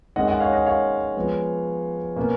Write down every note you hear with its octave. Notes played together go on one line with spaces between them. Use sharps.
D#3 G#3 C#4 D#5 F#5
D#5 F#5
C#5 F5
D#5 F#5
C#5 F5
F3 G#3 B3
B2 A#3 C#4